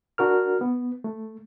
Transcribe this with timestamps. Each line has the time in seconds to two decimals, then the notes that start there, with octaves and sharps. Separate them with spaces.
0.18 D4 F#4 A#4 F6
0.61 B3
1.04 A3